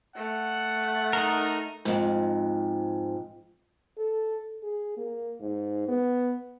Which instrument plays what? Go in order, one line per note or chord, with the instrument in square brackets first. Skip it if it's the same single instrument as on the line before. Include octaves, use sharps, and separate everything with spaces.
[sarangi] A3 [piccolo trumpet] F#5
[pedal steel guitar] D#4 A#4
[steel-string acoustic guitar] F2 G#2
[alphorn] A4
G#4
A#3
G#2
B3